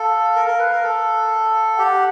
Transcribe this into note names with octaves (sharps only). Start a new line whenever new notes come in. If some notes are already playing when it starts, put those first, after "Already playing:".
Already playing: A4 F5
A#4
A#4
B4
A#4
A4
G4 F#5